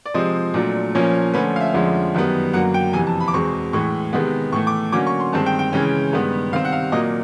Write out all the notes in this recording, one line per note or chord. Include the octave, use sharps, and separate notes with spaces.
D5
C3 F3 G#3 C4 D#5
A#2 F#3 A3 D4
A#2 F3 A#3 C#4 C#5
D3 F3 A3 C#4 B4
F5
E5
F2 D3 F3 G#3 C#4
F#2 D#3 G3 B3
F#2 D3 F#3 A#3 F#5
G5
F2 C3 E3 G#5
A5
B5
D6
E2 B2 G#3 C4 C#6
A2 E3 G#3 C#6
C3 D#3 G#3 B3
A2 E3 A3 C#6
D6
D3 F#3 A#3 C#4 D6
C#6
C6
G2 D#3 G#3 C4 A5
G5
G5
C#3 E3 G#3 C#4
G2 D#3 G#3 B3
C3 D#3 G3 C4 F5
F#5
F5
A#2 F#3 A#3 D#5